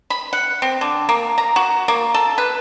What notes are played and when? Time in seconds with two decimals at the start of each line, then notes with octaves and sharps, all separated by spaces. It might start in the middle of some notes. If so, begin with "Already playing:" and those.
0.10 B5
0.33 F#5
0.62 C4
0.81 D3
1.09 A#3
1.38 A#5
1.56 F#4
1.88 A#3
2.14 A4
2.38 B4